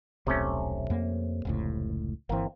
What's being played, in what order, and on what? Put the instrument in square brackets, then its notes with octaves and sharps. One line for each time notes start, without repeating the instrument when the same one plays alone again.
[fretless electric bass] D#1 B1 [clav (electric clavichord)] C3 A3 C#4
[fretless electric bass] F2 A#3
F1 C#2 A2
[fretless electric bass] G1 E3 [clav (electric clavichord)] A#3 C4